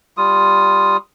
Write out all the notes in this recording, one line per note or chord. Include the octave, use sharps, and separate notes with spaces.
G3 F4 D#6